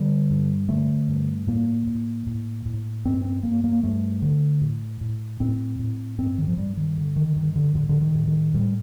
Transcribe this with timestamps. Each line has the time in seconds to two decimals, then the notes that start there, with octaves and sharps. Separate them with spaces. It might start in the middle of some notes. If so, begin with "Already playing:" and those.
Already playing: D3 G3
0.30 G2
0.69 D3 A3
1.08 G2
1.47 A2 A#3
1.87 A2
2.27 A2
2.66 A2
3.05 G2 C4
3.25 C4
3.43 G2 A#3
3.64 A#3
3.83 G2 A3
4.22 D3
4.62 A2
5.01 A2
5.40 A2 C4
5.79 A2
6.18 G2 C4
6.38 D#3
6.48 F3
6.57 G2 G3
6.77 D#3
6.98 D3
7.16 D#3
7.36 G2 D#3
7.56 D3
7.75 A2 D3
7.89 D3
8.01 D#3
8.15 A2
8.27 D#3
8.54 A2 G3